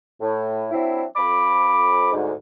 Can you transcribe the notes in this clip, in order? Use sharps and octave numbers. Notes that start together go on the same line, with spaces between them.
A2
F#3 C4 D4 E4
F2 B5 D6
D2 G#2